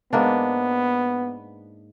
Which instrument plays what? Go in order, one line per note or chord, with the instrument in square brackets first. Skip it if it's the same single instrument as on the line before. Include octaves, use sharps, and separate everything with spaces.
[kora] G#2 A#3 D4 [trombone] B3